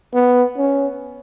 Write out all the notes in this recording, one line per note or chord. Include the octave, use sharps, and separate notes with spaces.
B3
C#4